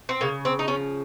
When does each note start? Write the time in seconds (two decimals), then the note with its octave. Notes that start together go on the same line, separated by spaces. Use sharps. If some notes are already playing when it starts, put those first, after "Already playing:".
0.09 C4
0.21 C#3 A#3
0.45 C4
0.59 D#4
0.68 F3 C#4